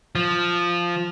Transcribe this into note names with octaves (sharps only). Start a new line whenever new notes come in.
F3